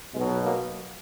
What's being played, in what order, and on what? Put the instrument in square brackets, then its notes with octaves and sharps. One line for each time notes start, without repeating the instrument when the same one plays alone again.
[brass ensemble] B1 B2 F#3 G#3
F#3 A#3